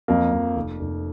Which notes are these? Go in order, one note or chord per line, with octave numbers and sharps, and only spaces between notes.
F2 A#3
F2
F1
F1